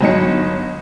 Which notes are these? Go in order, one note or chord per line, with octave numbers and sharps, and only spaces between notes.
G1 F#3 D#4 C#7